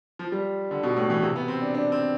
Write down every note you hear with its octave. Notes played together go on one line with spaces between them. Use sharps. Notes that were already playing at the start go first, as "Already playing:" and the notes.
F3
G3
D3
B2
A2
E3
C3
B3
C4
D4
D4
C4